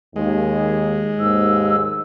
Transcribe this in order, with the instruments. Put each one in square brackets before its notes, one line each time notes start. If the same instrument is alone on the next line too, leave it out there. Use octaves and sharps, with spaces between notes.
[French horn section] D#2 [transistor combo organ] G#3 [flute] G#4
[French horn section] D#2 G#2 [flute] E6